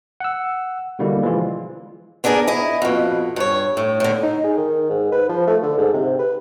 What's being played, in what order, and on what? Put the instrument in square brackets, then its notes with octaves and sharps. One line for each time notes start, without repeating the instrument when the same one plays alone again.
[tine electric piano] F#5 E6
B2 D3 G3 A#3 E4
E3 F3 G#3 F4
[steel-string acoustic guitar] B3 D4 E4 G#4 A#4
E4 D#5
F2 B2
G2 C#5
A2
A2 D3
[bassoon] D#4
G#4
D#3
G#2
B4
F3
A3
D3
G#2
C3
B4